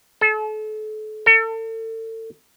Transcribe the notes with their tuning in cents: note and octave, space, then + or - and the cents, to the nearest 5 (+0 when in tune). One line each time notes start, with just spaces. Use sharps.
A4 -35
A4 +35